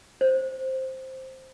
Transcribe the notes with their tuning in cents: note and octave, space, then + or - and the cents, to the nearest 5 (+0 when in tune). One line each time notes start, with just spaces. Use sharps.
C5 +5